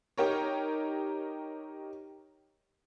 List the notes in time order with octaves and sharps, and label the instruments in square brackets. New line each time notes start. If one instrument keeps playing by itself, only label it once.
[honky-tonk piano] D#4 G4 A#4 C#5